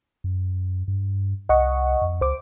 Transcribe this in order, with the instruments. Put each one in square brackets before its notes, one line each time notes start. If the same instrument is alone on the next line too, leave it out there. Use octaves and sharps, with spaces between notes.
[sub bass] F#2
G2
[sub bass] C2 [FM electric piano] D#5 F#5 C#6
[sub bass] F2
[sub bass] C#2 [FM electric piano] C5 D6